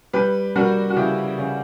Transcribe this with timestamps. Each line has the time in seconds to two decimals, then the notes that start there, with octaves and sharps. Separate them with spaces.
0.13 G3 G4 B4
0.56 G3 F#4 A#4
0.90 F#4
0.96 C#3 E4 G4
1.39 C#3